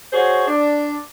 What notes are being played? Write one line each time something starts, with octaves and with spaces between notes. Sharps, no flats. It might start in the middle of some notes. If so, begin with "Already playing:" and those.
F#4 G#4 C5 C#5
D4